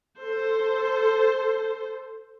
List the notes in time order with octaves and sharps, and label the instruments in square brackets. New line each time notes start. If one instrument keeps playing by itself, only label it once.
[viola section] A4 C5